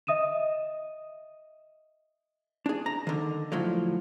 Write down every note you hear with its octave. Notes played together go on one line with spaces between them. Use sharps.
D#5 E5 D#6 D#7 E7
D4 G#4
A#5
D3 D#3
D2 A2 F3 F#3